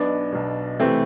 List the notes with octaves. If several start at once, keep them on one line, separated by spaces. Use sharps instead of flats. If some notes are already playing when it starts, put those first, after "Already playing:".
Already playing: B1 B2 B3 D4
B1 B2
C3 E3 A3 C4